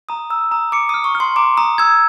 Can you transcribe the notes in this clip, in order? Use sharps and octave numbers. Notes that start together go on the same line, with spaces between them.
A#5 D#6
A#5 E6
A#5 D#6
D6 C#7
D#6
F6
C#6
F6
C6
A#5 D6
A#5 D#6
E6 G#6